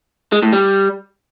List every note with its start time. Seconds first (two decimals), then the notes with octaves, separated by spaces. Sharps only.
0.32 G#3
0.43 A2
0.53 G3